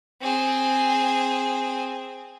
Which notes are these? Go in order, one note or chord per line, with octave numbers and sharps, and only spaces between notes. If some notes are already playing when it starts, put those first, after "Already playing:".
C4 G#4